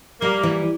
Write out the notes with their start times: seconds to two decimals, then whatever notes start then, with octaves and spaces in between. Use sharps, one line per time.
0.21 G3 A#3
0.43 E3